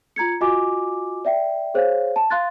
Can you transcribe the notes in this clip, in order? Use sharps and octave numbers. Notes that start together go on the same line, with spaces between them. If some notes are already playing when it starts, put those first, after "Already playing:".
F4 A#5 G#6 C#7
F4 F#4 D#5 G#5 D6
D5 E5 G5
G#4 C5 C#5 F5
A5
F5 C6 F#6 A6